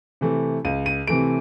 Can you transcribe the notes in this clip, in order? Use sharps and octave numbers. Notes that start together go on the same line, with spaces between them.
C3 E3 A3
C#2 D#7
D#7
C3 E3 A3 D7